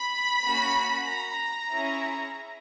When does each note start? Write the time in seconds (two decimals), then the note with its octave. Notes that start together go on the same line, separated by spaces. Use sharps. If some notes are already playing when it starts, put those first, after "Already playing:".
Already playing: B5
0.44 A#3 C#4 F#4
1.07 A#5
1.71 C#4 E4 G#4